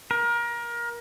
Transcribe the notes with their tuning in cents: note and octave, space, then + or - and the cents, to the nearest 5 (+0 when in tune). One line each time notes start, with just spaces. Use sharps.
A#4 +25